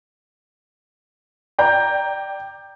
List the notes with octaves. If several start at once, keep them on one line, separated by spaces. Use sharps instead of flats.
D5 G5 A#5 G6